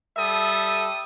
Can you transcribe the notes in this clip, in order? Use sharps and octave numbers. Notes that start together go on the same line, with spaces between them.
G3 A4 E5 D#6